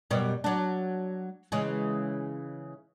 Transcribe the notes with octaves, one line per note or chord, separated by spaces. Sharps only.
F#2 B2 G3
F#3 D4
C#3 E3 G#3